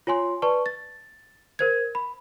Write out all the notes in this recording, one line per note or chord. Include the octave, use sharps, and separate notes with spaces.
F4 C#5 G#5 C6
B4 D5 A5 C#6
A6
A#4 C5 G#6
B5